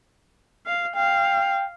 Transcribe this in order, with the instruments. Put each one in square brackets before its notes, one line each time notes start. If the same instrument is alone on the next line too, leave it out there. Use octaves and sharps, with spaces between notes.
[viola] F5
[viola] F5 [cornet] G5